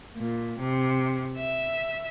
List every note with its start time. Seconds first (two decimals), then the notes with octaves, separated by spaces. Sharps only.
0.17 A#2
0.60 C3
1.37 E5